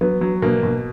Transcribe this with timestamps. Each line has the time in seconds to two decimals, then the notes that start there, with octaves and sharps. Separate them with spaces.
0.01 F#3 B3
0.21 F#3
0.42 B2 A#3
0.63 B2